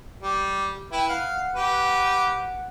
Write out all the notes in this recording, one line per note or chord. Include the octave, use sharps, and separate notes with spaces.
G3 G4
E4 B4 G5
F5 F#5
G4 B4